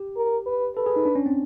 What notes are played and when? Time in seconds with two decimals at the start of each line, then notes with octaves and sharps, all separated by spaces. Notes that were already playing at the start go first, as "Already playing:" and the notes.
Already playing: G4
0.16 A#4
0.46 B4
0.76 A4 B4
0.86 G#4
0.96 D#4
1.05 D4
1.15 C#4
1.26 C4